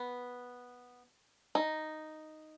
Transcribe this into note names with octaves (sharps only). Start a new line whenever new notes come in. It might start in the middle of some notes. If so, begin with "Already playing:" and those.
Already playing: B3
D#4